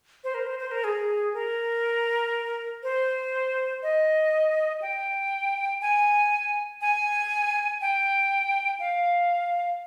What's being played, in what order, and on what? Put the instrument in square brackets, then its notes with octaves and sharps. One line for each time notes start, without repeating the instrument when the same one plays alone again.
[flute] C5
A#4
C5
C5
A#4
G#4
A#4
C5
D#5
G5
G#5
G#5
G5
F5